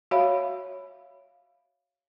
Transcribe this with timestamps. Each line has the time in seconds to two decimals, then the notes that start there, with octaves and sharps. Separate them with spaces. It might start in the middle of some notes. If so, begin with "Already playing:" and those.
0.11 F#4 C#5 E5 F5 B5